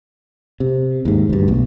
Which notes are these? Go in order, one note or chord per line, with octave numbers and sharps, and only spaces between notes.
C3
D#2 G#2
D2 G2
B1